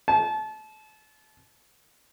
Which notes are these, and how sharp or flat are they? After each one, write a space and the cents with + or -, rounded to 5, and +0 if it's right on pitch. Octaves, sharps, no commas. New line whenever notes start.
A5 -30